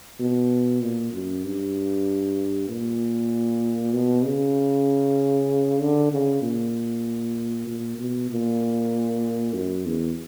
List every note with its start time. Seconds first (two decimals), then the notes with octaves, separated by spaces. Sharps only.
0.20 B2
0.82 A#2
1.13 F#2
1.44 G2
2.69 A#2
3.93 B2
4.24 C#3
5.80 D3
6.12 C#3
6.42 A#2
7.67 A#2
7.98 B2
8.30 A#2
9.54 F#2
9.85 E2